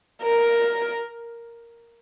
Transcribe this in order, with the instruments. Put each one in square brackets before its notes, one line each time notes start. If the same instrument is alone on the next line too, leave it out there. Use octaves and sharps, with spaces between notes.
[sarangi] A#4